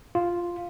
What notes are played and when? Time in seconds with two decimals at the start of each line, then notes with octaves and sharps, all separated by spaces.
0.15 F4